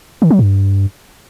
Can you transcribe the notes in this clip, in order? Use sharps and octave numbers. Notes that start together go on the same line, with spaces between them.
D#3
F#3
G2